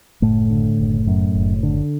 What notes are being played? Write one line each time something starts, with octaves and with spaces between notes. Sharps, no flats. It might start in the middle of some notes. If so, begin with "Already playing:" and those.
F#1 A2 A3
D3
F#1
F#2
F#1
D3